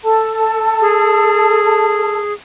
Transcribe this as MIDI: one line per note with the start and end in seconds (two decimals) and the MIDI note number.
0.03 2.18 69
0.03 2.18 81
0.81 2.33 68